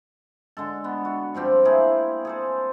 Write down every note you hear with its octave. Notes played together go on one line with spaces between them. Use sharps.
D3 G#3 A4
B3
F#4
G2 F3 C4 G4
A#3 E4 G#4
G#4 A4 C5